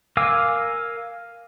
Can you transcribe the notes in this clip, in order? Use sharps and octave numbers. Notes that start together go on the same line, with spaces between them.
A#4 F5 G#5 D6 E6